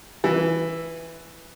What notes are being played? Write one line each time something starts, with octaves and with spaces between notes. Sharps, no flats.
E3